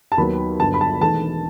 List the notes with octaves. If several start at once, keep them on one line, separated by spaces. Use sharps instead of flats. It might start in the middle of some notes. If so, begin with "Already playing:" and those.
A5
D#2 D#3 F#3 B3 B5
G1 G2 F#3 B3 A5
B5
A5
E1 E2 D#3 A3 A5